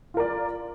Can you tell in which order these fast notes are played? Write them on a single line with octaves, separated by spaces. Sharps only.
F4 A#4 D5